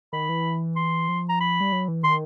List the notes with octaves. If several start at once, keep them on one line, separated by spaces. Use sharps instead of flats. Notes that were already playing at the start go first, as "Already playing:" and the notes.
D#3 B5
E3
C6
F3
A#5
B5
G3
F#3
E3
D#3 C6